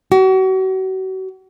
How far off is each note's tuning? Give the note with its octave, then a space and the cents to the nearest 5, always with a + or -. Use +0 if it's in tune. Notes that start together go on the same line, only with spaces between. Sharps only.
F#4 +35